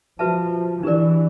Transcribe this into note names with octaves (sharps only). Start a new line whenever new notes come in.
F3 F#4 B4 E5 A5
E3 D4 G4 A#4 D5